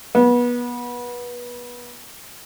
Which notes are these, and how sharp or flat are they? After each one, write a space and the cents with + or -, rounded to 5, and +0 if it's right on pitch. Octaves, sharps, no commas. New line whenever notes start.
B3 -25